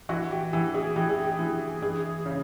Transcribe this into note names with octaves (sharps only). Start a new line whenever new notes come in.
E3 F#4
G4
E3 G4
G#4
E3 G4
G#4
G4
E3
E3 G#4
C#3